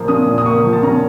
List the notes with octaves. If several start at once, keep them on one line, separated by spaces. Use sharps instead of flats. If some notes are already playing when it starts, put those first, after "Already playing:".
Already playing: A#2 F3 A#3
C#4 D#6
A#2
D#6
A#3 C#6
F3
A5
C#4 A#5